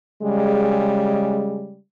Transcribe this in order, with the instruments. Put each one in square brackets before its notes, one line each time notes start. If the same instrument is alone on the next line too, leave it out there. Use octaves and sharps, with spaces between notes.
[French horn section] C#3 G3 G#3